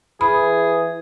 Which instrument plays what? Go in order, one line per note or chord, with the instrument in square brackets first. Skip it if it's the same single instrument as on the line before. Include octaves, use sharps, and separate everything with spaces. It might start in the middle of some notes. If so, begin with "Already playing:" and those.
[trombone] E3 [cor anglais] G#4 [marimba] B5